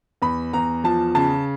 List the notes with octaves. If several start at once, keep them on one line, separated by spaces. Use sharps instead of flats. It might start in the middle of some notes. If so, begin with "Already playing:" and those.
E2 B5
E2 A#5
F3 A5
C#3 A5